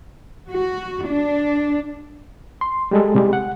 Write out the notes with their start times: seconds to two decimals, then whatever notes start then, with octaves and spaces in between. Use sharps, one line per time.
0.51 F#4
1.07 D4
2.61 C6
2.91 G3 G#3 A4
3.15 C3 G3 G#3
3.33 F#5